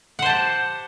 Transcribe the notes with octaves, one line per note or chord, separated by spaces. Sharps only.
G4 C5 F#5 A5